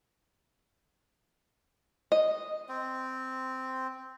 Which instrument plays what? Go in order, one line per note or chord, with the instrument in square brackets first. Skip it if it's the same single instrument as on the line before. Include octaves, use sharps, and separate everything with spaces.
[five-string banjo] D#5
[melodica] C4